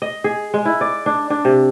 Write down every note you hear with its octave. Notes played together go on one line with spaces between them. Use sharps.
D#5
G#4
G#3
E4
D5
D4
D4
C3